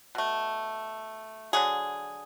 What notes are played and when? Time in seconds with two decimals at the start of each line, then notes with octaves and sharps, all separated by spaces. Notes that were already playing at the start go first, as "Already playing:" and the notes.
0.15 B2 A3
1.53 D3 F#3 A3 G#4